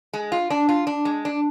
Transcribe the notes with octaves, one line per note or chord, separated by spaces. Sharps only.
G#3
F4
D4
F4
D4
G#3
D4